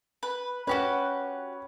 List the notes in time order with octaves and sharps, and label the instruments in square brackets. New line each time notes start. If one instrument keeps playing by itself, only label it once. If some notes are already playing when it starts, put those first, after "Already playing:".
[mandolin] B4
[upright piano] C#4 [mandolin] F#4 G4 B4